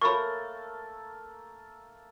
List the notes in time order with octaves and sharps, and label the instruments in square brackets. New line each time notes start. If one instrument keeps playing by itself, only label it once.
[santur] A3 A#3 A4 [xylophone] A#4 C#5 [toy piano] B5 C#6